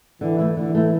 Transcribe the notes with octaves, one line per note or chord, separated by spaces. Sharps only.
D3 E3
A3 E4
D3 E3
A3 E4